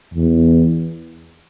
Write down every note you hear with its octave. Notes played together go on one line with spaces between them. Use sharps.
E2